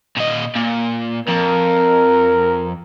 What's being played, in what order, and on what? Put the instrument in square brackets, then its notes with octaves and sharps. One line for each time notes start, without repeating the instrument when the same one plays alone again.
[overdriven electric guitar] A#2 D#5
A#2
[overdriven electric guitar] F2 [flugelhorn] A#4